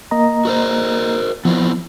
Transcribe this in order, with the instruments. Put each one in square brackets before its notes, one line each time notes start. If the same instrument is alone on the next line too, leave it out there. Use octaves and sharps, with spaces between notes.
[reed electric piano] A#3 D#5 A#5
[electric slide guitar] F#4 A#4 C5
[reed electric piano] F3 [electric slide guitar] B3 C4 E4